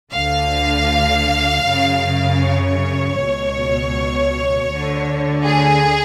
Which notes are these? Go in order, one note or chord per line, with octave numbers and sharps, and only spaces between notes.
D2 D3 F5
F#2 C#3
C#5
C#2 B2
D2 D3
G#4